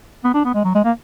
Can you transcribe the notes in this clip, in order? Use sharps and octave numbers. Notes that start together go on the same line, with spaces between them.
B3
D4
B3
G#3
F#3
G#3
A#3